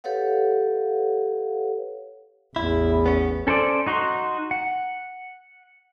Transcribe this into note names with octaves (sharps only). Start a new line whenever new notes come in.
G4 A4 B4 C#5 F5 F#5
A1 E2 E4
B3 C#4
C#4 A4 C5 D5
D#4 F#4 A#5 C6
F#5